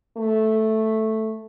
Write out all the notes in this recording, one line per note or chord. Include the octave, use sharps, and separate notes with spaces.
A3